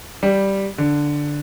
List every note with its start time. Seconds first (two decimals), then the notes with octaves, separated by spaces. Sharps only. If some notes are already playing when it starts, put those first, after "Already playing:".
0.23 G3
0.78 D3